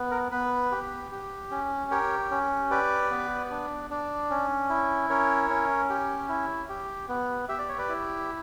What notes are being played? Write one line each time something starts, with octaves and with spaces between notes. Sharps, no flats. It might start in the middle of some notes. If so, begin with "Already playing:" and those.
Already playing: B3
A#4
B3 B4
G4
G4
C#4
G4 A#4 C#5
C#4
G4 B4 D5
B3
D4
D4
C#4
E4
C#4 A#4 C#5
C#4
G4
E4
G4
B3
G4 E5
D5
C#5
B4 D5
E4